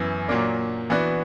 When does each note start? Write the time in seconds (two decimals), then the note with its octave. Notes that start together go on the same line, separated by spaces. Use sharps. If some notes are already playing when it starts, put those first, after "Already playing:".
Already playing: F#2 E3 B3 E4
0.28 A#2 F#3 A#3 D4
0.90 E3 B3 D4 F#4